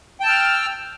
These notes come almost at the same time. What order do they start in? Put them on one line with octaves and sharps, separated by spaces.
G5 A5 E6 F6